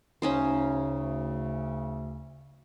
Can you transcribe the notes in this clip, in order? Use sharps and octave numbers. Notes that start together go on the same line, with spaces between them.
D2 C#3 C#4 D#4 C5